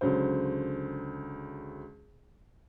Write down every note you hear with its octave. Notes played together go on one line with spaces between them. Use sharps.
C#2 D3 F#3 C5